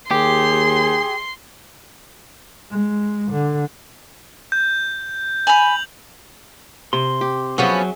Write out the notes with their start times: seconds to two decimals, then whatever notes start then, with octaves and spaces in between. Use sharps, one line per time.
0.11 D#2 G4 G#4 C6
2.71 G#3
3.32 D3
4.52 G6
5.47 G#5 B5 F7 F#7
6.93 C3 C6
7.21 G4
7.58 F3 F#3 B3 C#4 G#4 C#5 E5